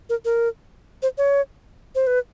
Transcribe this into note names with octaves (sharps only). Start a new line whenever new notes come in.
A#4
A#4
C5
C#5
C5
B4